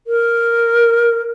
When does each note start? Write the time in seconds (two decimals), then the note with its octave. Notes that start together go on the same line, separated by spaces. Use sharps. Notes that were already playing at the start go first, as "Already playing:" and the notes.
0.07 A#4